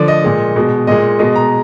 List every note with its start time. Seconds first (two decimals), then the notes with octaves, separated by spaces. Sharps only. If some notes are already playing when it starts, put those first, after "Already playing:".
Already playing: D3 F3 D5
0.08 D#5
0.24 A#2 G#3
0.56 B2 G#3
0.87 A#2 G#3 D#5
1.19 B2 G#3 D#5
1.36 A#5